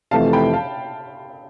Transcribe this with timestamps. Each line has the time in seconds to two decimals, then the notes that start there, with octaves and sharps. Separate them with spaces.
0.11 F2 C3 E3 A3 F5 A5
0.33 G5 B5
0.53 F5 A5